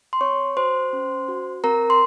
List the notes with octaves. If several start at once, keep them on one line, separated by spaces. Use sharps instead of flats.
C6
C4 C#5 C#6
F#4 C5 C6
C#4
F#4
C4 A#4 A#5
C6